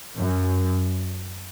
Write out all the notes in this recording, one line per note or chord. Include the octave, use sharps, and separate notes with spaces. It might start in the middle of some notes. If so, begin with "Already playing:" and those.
F#2